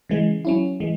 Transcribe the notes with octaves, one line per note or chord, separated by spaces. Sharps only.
C#3 E3 G#3
F#3 C#4 E4
E3 G#3